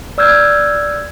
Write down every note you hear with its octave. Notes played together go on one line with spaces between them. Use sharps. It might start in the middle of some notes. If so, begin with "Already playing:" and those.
D5 E6 F6 G6 G#6